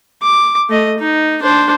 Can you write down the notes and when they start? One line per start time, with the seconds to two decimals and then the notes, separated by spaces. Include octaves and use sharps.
0.22 D6
0.69 A3 D#5
0.99 D#4
1.42 D4 C5